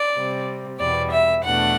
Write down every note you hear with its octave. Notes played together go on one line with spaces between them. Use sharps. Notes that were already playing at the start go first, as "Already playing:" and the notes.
Already playing: D5
C3 G3 C4
E2 B2 G3 D5
E5
E2 B2 A3 D4 F#5